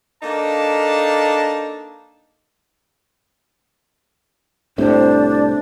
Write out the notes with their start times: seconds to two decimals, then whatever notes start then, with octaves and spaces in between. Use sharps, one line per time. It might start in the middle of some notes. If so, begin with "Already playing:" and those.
0.23 A#3 D4 D#4 A4 F5 A5
4.78 C2 A2 C3 D4 C5